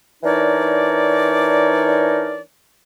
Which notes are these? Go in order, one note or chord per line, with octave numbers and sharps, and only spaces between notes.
E3 D4 D#4 A#4 C#5 D5